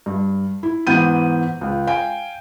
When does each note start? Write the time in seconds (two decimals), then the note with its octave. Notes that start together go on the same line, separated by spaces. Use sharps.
0.06 G2
0.63 E4
0.87 G#2 E3 B3 G6 D#7
1.61 C#2
1.87 F5 G5 G#5